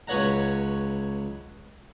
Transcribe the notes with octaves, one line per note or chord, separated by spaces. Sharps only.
C#2 C#4 B4 C#5 F#5 A#5